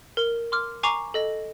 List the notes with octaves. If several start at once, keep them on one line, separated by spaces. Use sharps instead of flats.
A#4 G7
C6 D6 F6
G#5 A#5 C#6 D6 C7 F7
A4 D#5 A#6